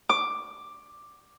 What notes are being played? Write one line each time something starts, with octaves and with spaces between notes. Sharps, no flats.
D6